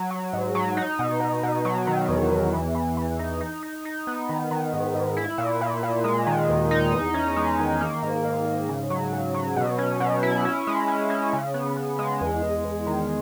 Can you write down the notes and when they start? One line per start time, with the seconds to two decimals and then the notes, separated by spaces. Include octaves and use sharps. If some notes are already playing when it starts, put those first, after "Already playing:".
Already playing: F#3
0.11 F#3
0.33 G#2
0.55 F#3
0.77 D#4
0.99 B2
1.20 B2
1.43 B2
1.65 F#3
1.87 D#3
2.08 E2
2.30 E2
2.53 E3
2.75 E3
2.97 E3
3.19 D#4
3.41 D#4
3.63 D#4
3.85 D#4
4.07 B3
4.29 D#3
4.51 D#3
4.73 G#2
4.95 G#2
5.17 E4
5.38 A#2
5.61 A#2
5.83 A#2
6.04 G#3
6.27 D#3
6.49 D#2
6.71 D#4
6.93 E2
7.14 C#4
7.36 G#3
7.59 D#3
7.81 A#3
8.03 G#2
8.24 G#2
8.46 G#2
8.69 C#3
8.90 F#3
9.13 C#3
9.34 F#3
9.56 B2
9.79 C#4
10.00 B2
10.23 E4
10.45 C#4
10.67 G#3
10.88 C#4
11.10 C#4
11.33 C#3
11.54 B3
11.77 B3
11.99 G#3
12.21 E2
12.42 E2
12.64 E2
12.87 D#3